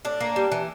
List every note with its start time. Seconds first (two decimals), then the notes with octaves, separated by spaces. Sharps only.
0.05 A2 D4
0.21 A#3
0.36 G3
0.52 E3